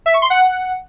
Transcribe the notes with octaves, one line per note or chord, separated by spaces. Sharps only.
E5
C#6
C6
F#5